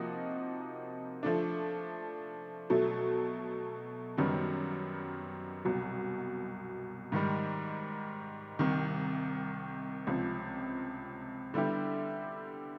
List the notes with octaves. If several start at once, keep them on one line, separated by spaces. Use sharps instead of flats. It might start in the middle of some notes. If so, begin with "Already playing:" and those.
Already playing: C3 F3 A#3 D#4 F#4
F3 A3 D4
B2 F#3 A3
F#2 D#3 G3 B3
C2 B2 F#3
G#2 D#3 G3
C2 C3 D#3
C#2 C3 F3
D3 G3 B3 E4 G4